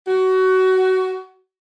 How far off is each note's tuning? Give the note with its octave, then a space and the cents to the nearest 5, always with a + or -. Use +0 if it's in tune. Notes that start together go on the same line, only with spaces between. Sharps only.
F#4 +20